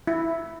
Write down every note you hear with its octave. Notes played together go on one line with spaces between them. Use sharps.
E4